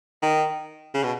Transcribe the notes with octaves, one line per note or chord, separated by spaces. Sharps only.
D#3
C#3
B2